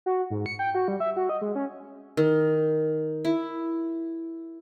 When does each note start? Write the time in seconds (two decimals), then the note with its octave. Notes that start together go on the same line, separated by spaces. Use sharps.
0.06 F#4
0.30 G#2
0.46 C#7
0.59 G5
0.75 F#4
0.88 G3
1.00 E5
1.16 F#4
1.29 D#5
1.42 G#3
1.55 C#4
2.17 D#3
3.25 E4